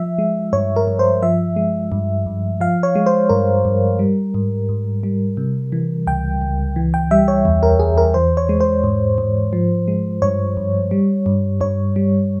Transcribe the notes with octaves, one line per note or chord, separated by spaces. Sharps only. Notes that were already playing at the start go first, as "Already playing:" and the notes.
Already playing: F3 E5
G#3
G2 C#5
A#4
G2
C5
F3 E5
G#3
G2
G2
F3 F5
C#5
G#3
C5
G2 A#4
G2
G3
G#2
G#2
G3
C3
E3
C#2 G5
C#2
E3
G5
G3 E5
C#5
E2
A#4
E2 G#4
A#4
E3 C5
C#5
G#3
C5
G#2
G#2
F3
G#3
G2 C#5
G2
G3
G2
G2 C#5
G3